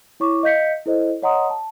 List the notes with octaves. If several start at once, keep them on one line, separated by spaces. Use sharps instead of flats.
E4 C#5 C#6 D6
D#5 F5 G6 B6 C#7
E4 A4 C5 D#5
C#5 D#5 F#5 A#5 C6 D#6
A5